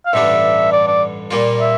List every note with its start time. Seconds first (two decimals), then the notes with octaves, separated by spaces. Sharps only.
0.06 F5
0.13 A1 G2 D3 G3 D4 E5
0.72 D5
0.87 D5
1.31 A#2 G3 A#3 F4
1.60 E5